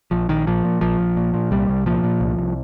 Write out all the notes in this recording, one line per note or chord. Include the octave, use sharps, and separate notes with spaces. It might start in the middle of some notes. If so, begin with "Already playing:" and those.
A#1 F3
A#1 D#3
A#2 F3
A#2
A#1 F3
A#1
A#2
A#2
C2 G3
C2
A#2 F3
A#2
C2
C2